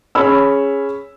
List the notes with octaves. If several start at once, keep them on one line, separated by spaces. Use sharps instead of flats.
C#4 G#4 C#5 B5 E6